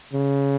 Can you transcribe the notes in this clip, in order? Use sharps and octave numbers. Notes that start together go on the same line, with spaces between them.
C#3